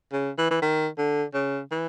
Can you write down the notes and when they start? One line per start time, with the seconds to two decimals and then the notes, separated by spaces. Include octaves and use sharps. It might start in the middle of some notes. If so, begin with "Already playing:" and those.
0.12 C#3
0.38 E3
0.50 E3
0.62 D#3
0.98 D3
1.34 C#3
1.71 E3